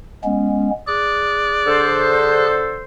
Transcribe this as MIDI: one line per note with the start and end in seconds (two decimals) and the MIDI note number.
0.24 0.70 56
0.24 0.70 59
0.24 0.70 61
0.88 2.46 68
0.88 2.20 74
0.88 2.46 90
1.66 2.84 50
1.66 2.84 69
1.66 2.84 72